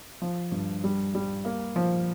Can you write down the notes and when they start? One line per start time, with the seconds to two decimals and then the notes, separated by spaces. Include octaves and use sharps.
0.22 F3
0.52 G2
0.84 G3
1.15 G3
1.45 A#3
1.76 F3